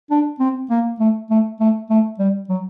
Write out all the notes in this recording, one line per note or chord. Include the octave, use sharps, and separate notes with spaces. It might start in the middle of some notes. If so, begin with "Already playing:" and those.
D4
C4
A#3
A3
A3
A3
A3
G3
F#3